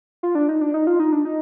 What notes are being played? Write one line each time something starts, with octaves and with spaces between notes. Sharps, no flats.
F4
D4
D#4
D4
D#4
F4
D#4
D4
D#4